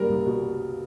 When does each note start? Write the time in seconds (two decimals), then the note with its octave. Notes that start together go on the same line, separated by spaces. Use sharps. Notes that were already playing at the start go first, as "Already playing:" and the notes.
Already playing: C#3 G3 A#3 A#4
0.09 C2
0.26 B2